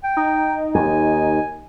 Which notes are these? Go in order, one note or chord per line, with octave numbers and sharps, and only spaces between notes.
G5
D#4
D#2 G#5